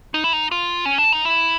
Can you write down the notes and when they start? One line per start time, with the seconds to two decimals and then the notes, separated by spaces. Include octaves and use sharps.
0.14 D#4
0.24 E4
0.33 D#4
0.51 F4
0.85 C#4
0.98 D4
1.13 D#4
1.25 E4